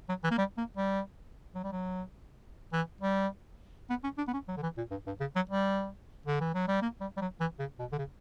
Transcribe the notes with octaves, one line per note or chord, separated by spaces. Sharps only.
F#3
E3
A#3
G3
A#3
G3
F#3
G3
F#3
E3
G3
B3
C#4
D4
B3
C#4
F#3
D3
E3
A#2
G2
G2
C#3
F#3
G3
D3
E3
F#3
G3
A#3
G3
G3
F#3
E3
C#3
B2
D3
C#3